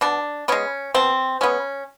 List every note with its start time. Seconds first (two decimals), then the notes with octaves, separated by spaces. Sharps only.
0.01 B2 D4
0.48 G#3 B3 C#4
0.94 B2 C4
1.41 G#3 B3 C#4